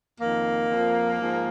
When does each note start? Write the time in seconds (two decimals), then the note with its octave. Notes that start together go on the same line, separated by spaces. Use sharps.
0.19 F2 D#3 A#3
0.69 F2 F3
1.19 G#2 F3